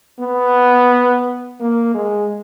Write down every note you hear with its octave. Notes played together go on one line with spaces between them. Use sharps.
B3
A#3
G#3